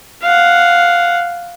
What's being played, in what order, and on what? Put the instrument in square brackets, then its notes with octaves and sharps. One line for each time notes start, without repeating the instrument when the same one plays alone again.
[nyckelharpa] F5 F#5